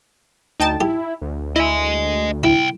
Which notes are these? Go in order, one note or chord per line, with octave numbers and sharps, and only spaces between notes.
D2 D#4 G5 A5
E4 G4
D2
E4 D#5 G#5
C2 E4 G5